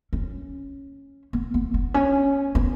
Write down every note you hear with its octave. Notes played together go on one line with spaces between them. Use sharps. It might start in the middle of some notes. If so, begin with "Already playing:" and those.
C#4
B3
B3
B3
C#4
B3